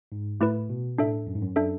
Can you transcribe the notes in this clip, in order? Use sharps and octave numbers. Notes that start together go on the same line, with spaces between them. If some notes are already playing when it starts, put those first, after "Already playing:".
G#2
A2 A3 E4 B4
B2
A2 D4 A4 E5
F#2
G#2
F#2
D4 A4 E5